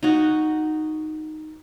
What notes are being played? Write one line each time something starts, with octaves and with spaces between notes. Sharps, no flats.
D#4 F#4